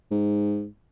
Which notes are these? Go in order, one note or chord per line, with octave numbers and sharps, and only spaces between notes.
G#2